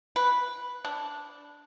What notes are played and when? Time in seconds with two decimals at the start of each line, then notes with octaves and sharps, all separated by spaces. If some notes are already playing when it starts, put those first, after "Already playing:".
0.16 B4
0.85 D4